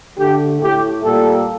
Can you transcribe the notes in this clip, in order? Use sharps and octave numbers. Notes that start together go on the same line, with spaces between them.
D3 A3 G4
A2 A3 G4
A#2 G3 A#3 A4